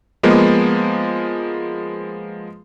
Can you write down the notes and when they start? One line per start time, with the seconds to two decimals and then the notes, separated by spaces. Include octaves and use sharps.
0.23 F3 G#3 A#3 B3